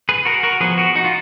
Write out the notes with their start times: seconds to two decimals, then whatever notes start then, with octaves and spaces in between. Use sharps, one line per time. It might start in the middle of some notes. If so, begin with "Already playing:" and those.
0.09 G#4 B4
0.25 F#4 A#4
0.43 F#4 A#4
0.61 F3 B3 G#4 B4
0.78 F#4 A#4
0.96 D#4 F#4
1.05 F4